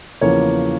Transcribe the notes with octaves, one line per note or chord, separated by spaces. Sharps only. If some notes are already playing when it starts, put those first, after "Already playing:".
E2 C#3 F3 A#3 C#5